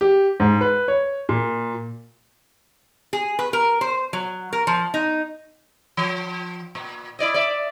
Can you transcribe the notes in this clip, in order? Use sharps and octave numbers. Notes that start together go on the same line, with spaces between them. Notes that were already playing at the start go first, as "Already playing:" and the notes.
G4
G#2
B4
C#5
A#2
G#4
B4
A#4
C5
F#3
A#4
F3
D#4
F3
A#2
E4 D5 D#5
D5 E5